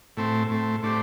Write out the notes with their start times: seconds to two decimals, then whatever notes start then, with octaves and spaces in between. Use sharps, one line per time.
0.17 A2 A3 C4
0.50 A2 A3 C4
0.83 A2 A3 D4 G4 C5